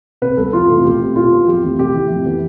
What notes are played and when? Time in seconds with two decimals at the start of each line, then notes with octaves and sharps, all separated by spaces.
0.22 C3 B4
0.37 G3 B3 A4
0.53 F2 F4
0.69 C3 E3 A3
0.84 B2 G4
1.00 A3 C4
1.15 B2 F4
1.32 B3
1.47 F2 G4
1.64 E3 A3 C4
1.79 C3 G4
1.94 E3 A3
2.10 F2
2.26 E3 B3